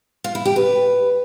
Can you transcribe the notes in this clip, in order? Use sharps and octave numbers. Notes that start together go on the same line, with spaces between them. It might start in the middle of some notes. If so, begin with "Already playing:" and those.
F4
E4
G4
B4